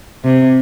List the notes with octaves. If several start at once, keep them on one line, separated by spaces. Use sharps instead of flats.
C3